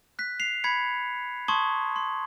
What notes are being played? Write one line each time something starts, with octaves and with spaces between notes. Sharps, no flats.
F#6 B6
C7 F7
B5 G#6 B6 C#7
A5 C6 C#6 D#6 G#6
C6